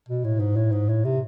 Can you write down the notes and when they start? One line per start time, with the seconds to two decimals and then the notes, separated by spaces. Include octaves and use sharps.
0.09 B2
0.24 A2
0.40 G#2
0.56 A2
0.72 G#2
0.89 A2
1.05 C3